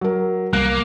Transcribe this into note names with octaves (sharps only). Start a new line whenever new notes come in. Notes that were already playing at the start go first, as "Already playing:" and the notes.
F#3 A#4
C2 G3 A#3 F#6